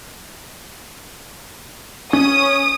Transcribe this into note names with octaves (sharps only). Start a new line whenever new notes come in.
C#4 D#6